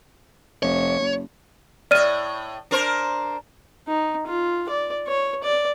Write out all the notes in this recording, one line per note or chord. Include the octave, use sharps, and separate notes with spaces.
F1 C#5
F#1
A2 D5 D#5 F6 D#7
D4 A#4 C5
D#4
F4
D5
C#5
D5